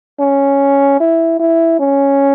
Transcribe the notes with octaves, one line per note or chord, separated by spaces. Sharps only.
C#4
E4
E4
C#4